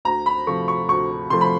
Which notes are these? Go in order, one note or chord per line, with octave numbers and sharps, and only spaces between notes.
D2 A#5
B5
C3 F3 A3 C#6
C#6
D2 C#6
C3 F3 A3 C6
B5